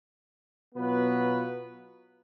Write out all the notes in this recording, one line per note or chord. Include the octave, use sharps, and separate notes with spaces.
B2 F#3 B3 F4 B4